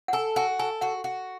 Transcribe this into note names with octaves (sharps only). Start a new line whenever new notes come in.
F#5
A4 G#5
F#4 G#5
A4 G#5
F#4 F#5
F#4